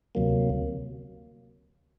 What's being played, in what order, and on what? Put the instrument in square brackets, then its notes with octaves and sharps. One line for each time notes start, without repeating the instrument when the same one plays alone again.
[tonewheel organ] D2 C3 F#3 A#3